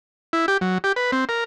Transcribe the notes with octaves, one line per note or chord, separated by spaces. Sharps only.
E4
G4
F#3
G4
B4
C4
A#4